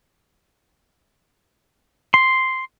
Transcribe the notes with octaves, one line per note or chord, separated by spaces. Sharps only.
C6